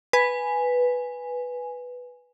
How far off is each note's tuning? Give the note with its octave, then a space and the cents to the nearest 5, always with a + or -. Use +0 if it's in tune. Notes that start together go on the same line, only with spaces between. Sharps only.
B4 +0 G#5 +0